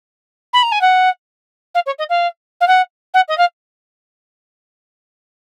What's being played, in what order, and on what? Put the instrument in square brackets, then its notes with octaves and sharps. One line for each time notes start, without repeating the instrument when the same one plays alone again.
[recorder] B5
A#5
G#5
F#5
F5
C#5
D#5
F5
F5
F#5
F#5
D#5
F5